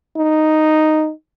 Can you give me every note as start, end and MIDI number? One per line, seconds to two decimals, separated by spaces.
0.18 1.11 63